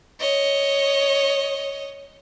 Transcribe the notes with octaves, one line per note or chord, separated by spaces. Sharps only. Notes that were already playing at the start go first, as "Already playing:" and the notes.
C#5 D#5